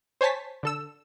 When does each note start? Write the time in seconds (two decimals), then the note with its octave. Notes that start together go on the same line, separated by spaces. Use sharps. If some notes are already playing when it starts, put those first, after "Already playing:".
0.21 C5 C#5 G#5 A5 B6
0.63 D3 A4 E6